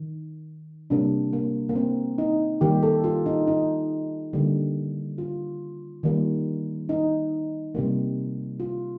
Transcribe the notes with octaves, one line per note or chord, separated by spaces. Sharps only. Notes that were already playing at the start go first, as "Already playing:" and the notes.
Already playing: D#3
C3 G3 A#3 D4
A#3
A#3
C4
D#4
D#3 G3 A#3 G4
A4
F4
D#4
D#4
D3 G3 A#3
F4
D#3 G3 A#3
D#4
C3 G3 A#3
F4